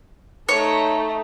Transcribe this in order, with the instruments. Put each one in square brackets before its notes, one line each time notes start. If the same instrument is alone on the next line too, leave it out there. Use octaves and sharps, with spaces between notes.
[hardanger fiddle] A3 D#4 [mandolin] C#5